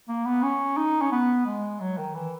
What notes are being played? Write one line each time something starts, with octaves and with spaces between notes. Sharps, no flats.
A#3
B3
C#4
D#4
C#4
B3
G#3
F#3
D#3
E3